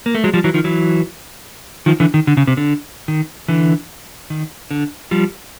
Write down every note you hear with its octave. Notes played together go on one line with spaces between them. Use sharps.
A#3
A3
F#3 G#3
F3 G3
E3 F#3
D#3 F3
E3 F#3
D#3 F3
D3 E3
D#3
D3
C#3
C3
D3
D#3
D3 E3
D#3
D3
F3 G3